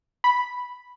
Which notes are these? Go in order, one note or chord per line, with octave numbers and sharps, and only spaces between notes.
B5